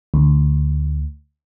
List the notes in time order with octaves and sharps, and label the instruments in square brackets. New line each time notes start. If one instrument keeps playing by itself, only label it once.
[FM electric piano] D2